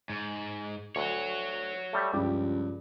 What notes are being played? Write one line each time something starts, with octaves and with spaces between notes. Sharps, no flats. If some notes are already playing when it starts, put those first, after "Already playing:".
G#2
D2 C#5 F#5
G3 A3
C#2 G2 F3 G4